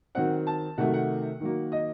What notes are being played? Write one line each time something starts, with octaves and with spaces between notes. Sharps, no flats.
D#3 F#3 C4 F#5
A5
C3 D#3 F#3 A3 F#5
F#5
D#3 F#3 A#3
D#5